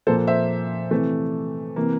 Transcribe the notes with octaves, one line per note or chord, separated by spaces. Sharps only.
A#2 F3 A#3 A4 C5
C5 E5
C3 E3 A3
C3 E3 A#3